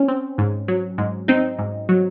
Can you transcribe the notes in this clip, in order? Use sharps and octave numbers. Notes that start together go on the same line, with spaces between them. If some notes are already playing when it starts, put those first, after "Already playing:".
Already playing: C#4
C4
G#2
F#3
G#2
C4 D#4
G#2
F#3